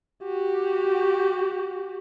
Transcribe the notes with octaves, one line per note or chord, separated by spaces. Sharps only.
F#4 G4